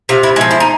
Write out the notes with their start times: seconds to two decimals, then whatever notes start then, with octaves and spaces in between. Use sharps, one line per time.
0.09 C3 F4
0.23 E4
0.36 G#3 E4
0.41 F3
0.51 E4
0.60 D#4